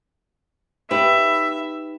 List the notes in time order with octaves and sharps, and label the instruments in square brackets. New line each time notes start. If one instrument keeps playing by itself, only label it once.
[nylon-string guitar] D#4 G4 B4 [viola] E5